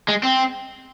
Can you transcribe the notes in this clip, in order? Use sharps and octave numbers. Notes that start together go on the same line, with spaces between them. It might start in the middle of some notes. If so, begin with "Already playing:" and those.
G#3
C4